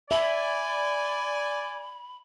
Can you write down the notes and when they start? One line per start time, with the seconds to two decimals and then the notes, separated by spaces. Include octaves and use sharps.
0.11 D5 E5 G#5 B5